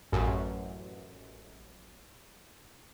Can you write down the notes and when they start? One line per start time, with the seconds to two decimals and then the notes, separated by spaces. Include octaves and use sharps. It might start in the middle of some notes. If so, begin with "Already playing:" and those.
0.12 A1 F#2